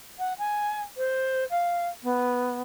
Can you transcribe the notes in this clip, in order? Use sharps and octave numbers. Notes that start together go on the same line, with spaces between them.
F#5
G#5
C5
F5
B3